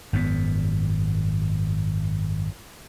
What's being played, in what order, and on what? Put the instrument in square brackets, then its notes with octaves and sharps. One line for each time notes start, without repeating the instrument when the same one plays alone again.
[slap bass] G#1 F#2 D#3 B3